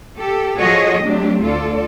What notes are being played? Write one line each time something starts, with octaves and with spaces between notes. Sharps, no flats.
G4 A4
F3 F#4 G#4 A4 C#5 D#5
F#3 A3 C4 D4 G4
D2 F4 A4 D5